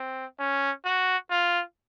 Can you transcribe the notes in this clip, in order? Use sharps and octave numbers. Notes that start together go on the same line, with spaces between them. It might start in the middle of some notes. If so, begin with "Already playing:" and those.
Already playing: C4
C#4
F#4
F4